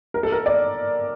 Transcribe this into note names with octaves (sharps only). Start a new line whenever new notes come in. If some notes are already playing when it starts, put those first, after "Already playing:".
A#4
A4
A#4
D5